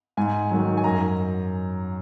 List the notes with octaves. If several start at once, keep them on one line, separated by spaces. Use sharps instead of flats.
G#2 G#5
D#3 F#3
G#5
F#2 A#5